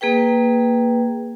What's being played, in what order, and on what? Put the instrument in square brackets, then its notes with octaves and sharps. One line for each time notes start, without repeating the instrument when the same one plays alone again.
[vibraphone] A#3 G#4 B4 G5